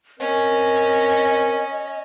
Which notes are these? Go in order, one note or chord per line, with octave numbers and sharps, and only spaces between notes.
C4 C#4 A#4 D#5